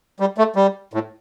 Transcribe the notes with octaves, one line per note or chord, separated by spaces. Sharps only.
G3
A3
G3
A2